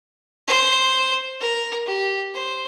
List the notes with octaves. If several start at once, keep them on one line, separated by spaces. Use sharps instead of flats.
C5
A#4
G4
C5